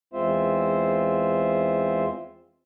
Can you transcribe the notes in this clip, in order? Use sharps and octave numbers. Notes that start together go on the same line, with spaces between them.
E2 G#3 C4 F4 C5 E5